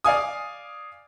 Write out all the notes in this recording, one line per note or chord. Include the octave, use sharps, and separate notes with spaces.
D5 F5 G#5 D#6